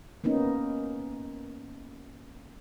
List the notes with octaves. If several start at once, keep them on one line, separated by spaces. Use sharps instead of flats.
A#3 B3 C#4 D#4